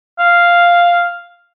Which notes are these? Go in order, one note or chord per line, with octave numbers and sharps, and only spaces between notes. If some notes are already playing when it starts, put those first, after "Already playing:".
F5